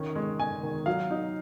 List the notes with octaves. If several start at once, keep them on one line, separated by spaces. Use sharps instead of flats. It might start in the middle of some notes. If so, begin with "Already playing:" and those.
Already playing: D#3 C#4
G#3
G#3 G#5
D#3
F#3 F5
D#4